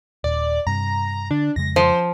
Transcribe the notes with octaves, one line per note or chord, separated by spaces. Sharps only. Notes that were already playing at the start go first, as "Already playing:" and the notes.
D#1 D5
G2 C3 A#5
D3 D4
F2 C#3 G#3 A#6
F3 C5